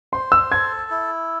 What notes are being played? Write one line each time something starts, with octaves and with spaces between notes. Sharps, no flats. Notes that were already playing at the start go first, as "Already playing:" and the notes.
C5 C6
E6
A4 G#6
E4